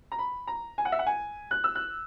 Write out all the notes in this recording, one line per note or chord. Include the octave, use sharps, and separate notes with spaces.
A#5
B5
A#5
G#5
F#5
E5
F#5
G#5
F#6
E6
F#6